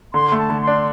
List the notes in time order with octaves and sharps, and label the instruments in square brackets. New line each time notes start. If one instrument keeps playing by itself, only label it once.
[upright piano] D3 [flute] C6
[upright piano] A3
[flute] A5
[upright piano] D3
[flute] C6
[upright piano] D4